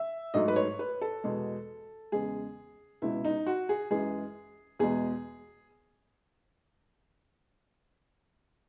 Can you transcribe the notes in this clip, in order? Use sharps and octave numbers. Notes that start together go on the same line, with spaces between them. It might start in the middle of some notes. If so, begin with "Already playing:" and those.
Already playing: E5
G#2 F#3 A3 D#5
B4
C#5
B4
A4
E2 B2 G#3
E2 C#3 G#3 G#4
C#2 B2 G#3 E4
D#4
F#4
G#4
F#2 E3 G#3 G#4
E2 B2 G#3 G#4